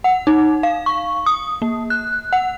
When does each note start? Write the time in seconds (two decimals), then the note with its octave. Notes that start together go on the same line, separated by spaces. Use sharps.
0.04 F#5
0.27 D#4
0.63 F5
0.86 C#6
1.26 D#6
1.62 A#3
1.90 F#6
2.33 F#5